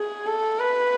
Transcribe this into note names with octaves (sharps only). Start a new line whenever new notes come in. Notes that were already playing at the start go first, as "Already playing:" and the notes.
Already playing: G#4
A4
B4